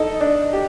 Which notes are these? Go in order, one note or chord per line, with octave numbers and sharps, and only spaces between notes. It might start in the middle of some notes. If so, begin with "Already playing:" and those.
Already playing: D#4 A4
D4
G4